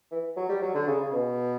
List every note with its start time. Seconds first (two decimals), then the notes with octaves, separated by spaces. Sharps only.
0.12 E3
0.37 F#3
0.49 G3
0.62 F#3
0.75 D3
0.87 C#3
1.02 C#3
1.12 B2